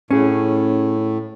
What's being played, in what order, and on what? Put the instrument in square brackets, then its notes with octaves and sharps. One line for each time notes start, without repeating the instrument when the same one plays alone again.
[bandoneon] A2 [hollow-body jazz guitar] C#4 G#4